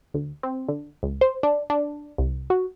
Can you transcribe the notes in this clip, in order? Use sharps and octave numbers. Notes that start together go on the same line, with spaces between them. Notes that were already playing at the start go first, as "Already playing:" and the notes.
D2
C4
D3
C#2
C5
D4
D4
C2
F#4